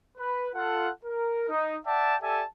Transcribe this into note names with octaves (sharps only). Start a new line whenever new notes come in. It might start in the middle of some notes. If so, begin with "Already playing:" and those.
B4
F4 A4 F#5
A#4
D#4
D5 E5 F#5 G5 A5
G4 A4 D5 E5 G#5 A5